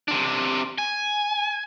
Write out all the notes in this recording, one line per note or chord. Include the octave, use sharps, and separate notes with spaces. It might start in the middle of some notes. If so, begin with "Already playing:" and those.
C3 D4
G#5